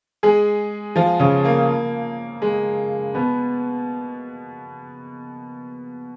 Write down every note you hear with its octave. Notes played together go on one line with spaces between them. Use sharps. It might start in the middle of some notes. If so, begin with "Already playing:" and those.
G#3 G#4
F3 F4
C#3 C#4
A#3
G#3
B2 B3